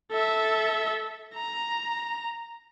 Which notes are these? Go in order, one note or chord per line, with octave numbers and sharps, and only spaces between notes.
A4 E5
A#5